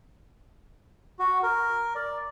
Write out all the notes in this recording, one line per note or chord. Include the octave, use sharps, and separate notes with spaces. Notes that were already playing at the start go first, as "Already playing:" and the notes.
F#4
A#4
D5